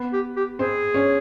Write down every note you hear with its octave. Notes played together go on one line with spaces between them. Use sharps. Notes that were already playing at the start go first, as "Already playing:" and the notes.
Already playing: B3 B4
G4
G4
C4 G#4 C5
C#4 C#5